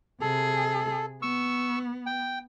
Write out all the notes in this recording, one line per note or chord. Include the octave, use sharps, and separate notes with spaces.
C3 G#4 A4
B3 C#6 E6
G5